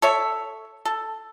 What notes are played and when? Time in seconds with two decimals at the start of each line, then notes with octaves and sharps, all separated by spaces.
0.02 A4 C#5 E5
0.85 A4